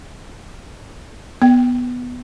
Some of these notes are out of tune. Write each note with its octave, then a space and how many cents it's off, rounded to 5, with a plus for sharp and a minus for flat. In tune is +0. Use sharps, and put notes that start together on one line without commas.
B3 +0 G5 -20